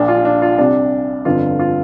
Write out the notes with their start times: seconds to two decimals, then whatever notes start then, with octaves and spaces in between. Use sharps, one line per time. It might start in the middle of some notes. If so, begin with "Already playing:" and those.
Already playing: A#1 A#2 D4
0.08 F4
0.25 D4
0.42 F4
0.58 C2 C3 D4
1.25 G1 F2 D3 F4
1.59 F4